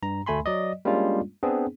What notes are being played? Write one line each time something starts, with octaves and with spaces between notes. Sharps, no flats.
G2 A#5
D2 A3 G#5 B5 C6
F#3 D5 D#5
G3 G#3 A#3 C#4 D4 F4
B3 C4 D4 G#4